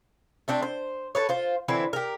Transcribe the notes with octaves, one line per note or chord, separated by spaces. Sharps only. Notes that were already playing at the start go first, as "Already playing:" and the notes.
A3 C4 D4
C5
A4 B4 C#5
F4 C5
D3 E3 C4 E4
G4 A#4